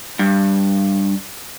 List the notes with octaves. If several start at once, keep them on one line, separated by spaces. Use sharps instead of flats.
G2